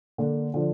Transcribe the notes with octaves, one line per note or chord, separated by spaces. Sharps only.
D3 A#3 D4
D3 F3 D4